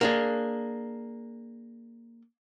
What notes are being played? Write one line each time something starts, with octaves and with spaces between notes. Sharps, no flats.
A#3 D4 G#4